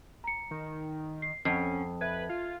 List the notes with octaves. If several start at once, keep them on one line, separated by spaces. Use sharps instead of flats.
A#5 C#7
D#3
C7
F2 C#4 F#5 C7
B4 E5 G#6
F4